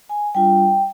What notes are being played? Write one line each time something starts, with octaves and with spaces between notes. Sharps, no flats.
G#5
G3 D4 F4 G5